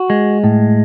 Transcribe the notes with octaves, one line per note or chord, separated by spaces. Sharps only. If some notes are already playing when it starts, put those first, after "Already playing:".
Already playing: F#4
G#3
A2